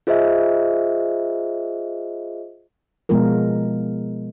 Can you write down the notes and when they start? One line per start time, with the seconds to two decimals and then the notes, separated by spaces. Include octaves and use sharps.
0.07 F4 G#4 C5 D#5 E5
3.09 B2 F3 G#3 B3 F4 A#4